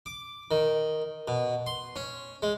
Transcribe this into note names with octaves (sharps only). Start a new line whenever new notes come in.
D6
D#3
B2
C6
C#4
G#3